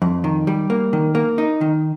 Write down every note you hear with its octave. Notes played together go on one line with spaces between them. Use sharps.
F2
D#3
G3
A#3
D#3
A#3
D#4
D#3